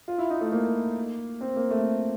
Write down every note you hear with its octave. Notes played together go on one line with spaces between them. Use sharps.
F4
E4
D#4
A3
A#3
C4
A#3
A3